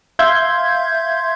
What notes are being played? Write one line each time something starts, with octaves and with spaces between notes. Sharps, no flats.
E5 F5 C6 G6 G#6